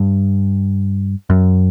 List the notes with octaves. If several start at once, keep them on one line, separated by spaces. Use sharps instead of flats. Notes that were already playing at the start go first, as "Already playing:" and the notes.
Already playing: G2
F#2